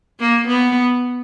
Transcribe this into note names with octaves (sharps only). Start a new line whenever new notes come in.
A#3
B3